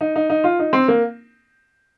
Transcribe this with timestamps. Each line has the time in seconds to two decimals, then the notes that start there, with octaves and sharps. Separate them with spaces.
0.01 D#4
0.16 D#4
0.30 D#4
0.44 F4
0.59 D#4
0.73 C4
0.88 A#3